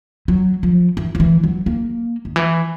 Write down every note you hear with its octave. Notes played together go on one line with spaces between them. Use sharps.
F#3
F3
E3
F3
E3
F#3
A#3
D#3
E3